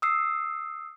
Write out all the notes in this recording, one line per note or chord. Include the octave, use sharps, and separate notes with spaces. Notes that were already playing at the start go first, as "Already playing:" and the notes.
D#6 E6 C7